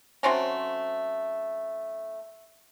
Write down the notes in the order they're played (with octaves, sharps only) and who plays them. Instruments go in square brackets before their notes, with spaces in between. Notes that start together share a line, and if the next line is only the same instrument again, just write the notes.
[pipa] F#3 A3 C4 C#4